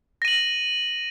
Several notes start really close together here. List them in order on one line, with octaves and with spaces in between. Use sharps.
A#6 D#7 F#7